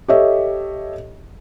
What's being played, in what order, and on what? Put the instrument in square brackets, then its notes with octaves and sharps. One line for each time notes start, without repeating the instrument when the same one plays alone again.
[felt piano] G4 A4 C#5 D#5 E5